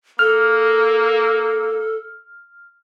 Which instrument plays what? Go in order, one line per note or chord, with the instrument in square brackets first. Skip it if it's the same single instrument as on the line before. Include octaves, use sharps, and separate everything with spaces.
[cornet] A#3 [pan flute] A4 [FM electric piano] F6